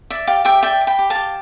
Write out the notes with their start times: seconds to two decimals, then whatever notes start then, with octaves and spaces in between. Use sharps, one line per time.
0.10 D5 E5
0.27 G4 F5
0.45 G4 E5 G5
0.63 D5 E5 G5
0.81 D5
0.87 G5 B5
0.99 G4
1.10 F5 A5
1.15 G4